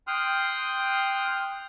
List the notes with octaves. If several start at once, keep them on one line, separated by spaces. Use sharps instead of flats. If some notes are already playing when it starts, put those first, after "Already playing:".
G5 C6 D#6 F6 F#6